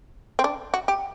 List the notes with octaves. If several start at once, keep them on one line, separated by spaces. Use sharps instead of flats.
C4
D4
F#4
G4